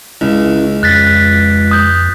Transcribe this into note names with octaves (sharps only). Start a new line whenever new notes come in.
C#2 C#4 E4
F2 F#6 A6 B6
D#6 G6